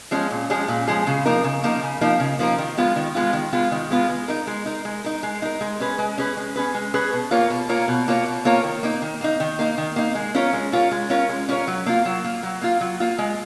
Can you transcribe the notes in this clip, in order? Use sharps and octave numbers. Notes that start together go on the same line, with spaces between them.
F3 G#3 C#4 G#4
A#2
F3 G#3 C#4 G#4
A#2
F3 G#3 C#4 G#4
C#3
F3 A#3 D#4 A#4
C#3
F3 A#3 D#4 A#4
C#3
F3 A#3 D#4 A#4
C#3
F3 A#3 D#4 A#4
D#3
G#3 B3 F4
D#3
G#3 B3 F4
D#3
G#3 B3 F4
D#3
G#3 B3 F4
G#3
D#4 A#4
G#3
D#4 A#4
G#3
D#4 A#4
G#3
D#4 A#4
G#3
C#4 G#4 B4
G#3
C#4 G#4 B4
G#3
C#4 G#4 B4
G#3
C#4 G#4 B4
B2
A#3 F4 A#4 C#5
B2
A#3 F4 A#4 C#5
B2
A#3 F4 A#4 C#5
B2
A#3 F4 A#4 C#5
D#3
A#3 D#4
D#3
A#3 D#4
D#3
A#3 D#4
D#3
A#3 D#4
G#3
C#4 F4 A#4 C#5
G#3
C#4 F4 A#4 C#5
G#3
C#4 F4 A#4 C#5
G#3
C#4 F4 A#4 C#5
F#3
A#3 F4
F#3
A#3 F4
F#3
A#3 F4
F#3
A#3 F4
G#3